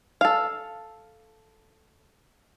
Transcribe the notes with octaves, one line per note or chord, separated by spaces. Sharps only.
A4 F5